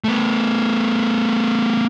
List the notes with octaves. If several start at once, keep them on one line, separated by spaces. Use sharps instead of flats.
A3 B3